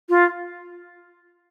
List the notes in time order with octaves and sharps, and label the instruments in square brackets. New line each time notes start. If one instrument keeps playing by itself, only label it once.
[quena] F4